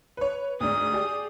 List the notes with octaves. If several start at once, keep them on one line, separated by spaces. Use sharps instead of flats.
B4 C#5
D2 G#2 D5 D#6
G4 G#4 D5